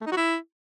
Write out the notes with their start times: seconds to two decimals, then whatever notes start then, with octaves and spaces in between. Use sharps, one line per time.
0.01 A3
0.06 D#4
0.11 F#4
0.17 E4